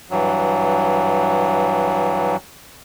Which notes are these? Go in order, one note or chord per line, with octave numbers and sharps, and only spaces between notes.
G2 E3 F#3